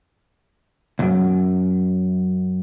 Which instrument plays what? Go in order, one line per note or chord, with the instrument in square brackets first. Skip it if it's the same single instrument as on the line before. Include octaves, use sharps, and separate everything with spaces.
[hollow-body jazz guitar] C#2 F#2